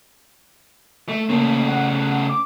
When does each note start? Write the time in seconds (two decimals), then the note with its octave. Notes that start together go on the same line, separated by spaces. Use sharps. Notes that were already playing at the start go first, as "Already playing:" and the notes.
1.09 A3
1.29 C#3 A3 A#3
1.68 F#5
2.29 D6